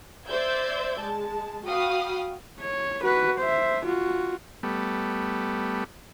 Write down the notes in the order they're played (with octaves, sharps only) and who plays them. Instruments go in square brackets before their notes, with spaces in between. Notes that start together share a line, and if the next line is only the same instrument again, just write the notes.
[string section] C5 D5 E5 E6 G6 G#6
G#3 A5
F#4 F5 G5 B5 D#6 F6
[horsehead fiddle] C#5
F#4 B4
C5 E5
F4 F#4
[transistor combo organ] G3 A3 B3